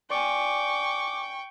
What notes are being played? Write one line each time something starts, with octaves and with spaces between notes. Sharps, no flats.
D5 G5 G#5 C#6 D6